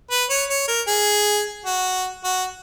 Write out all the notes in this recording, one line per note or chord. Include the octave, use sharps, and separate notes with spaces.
B4
C#5
C#5
A#4
G#4
F#4
F#4